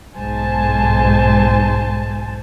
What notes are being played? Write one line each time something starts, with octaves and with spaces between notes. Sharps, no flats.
B1 G#2 C5 G#5 A5